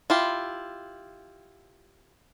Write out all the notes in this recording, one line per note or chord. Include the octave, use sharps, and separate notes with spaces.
E4 F4 G4